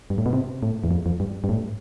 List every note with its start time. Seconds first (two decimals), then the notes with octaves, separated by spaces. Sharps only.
0.10 G2
0.18 A2
0.26 B2
0.33 C3
0.63 A2
0.84 E2
0.91 F2
1.06 F2
1.20 G2
1.44 G2
1.49 A2